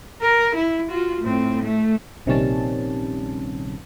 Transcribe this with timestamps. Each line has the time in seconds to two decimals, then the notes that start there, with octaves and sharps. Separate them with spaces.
0.21 A#4
0.55 E4
0.89 F4 F#4
1.21 A2 C4
1.63 A3
2.26 A#1 C3 D#3 G3 C#4 A5